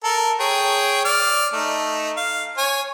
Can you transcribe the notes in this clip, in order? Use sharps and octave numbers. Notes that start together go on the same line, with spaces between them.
A4 A#4
G#4 C#5 G5
D5 F6
A3 D#4
F5
C#5 G#5